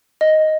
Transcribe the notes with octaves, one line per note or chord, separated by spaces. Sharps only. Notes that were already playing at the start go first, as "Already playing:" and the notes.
D#5